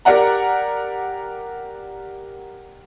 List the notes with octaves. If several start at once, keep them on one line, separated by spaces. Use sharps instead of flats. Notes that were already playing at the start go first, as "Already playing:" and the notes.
G4 A#4 D5 F#5 A#5